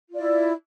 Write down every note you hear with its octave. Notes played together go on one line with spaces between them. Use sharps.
E4 F4 D5